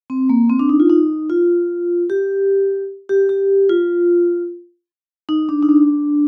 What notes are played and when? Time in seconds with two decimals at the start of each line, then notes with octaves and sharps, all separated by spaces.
0.10 C4
0.29 A#3
0.50 C4
0.59 D4
0.69 D#4
0.80 F4
0.90 D#4
1.30 F4
2.10 G4
3.09 G4
3.29 G4
3.69 F4
5.29 D#4
5.49 D4
5.62 D#4
5.69 D4